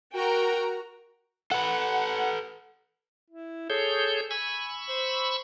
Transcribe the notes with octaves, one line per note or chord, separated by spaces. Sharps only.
F#4 A#4 G5 A#5
A4 B4 F#5
E4
G#4 A4 C#5 G6
G#5 B5 C#6 E6
C5